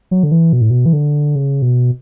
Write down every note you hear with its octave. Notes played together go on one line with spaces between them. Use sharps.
F#3
D3
E3
B2
A2
B2
E3
D3
C#3
B2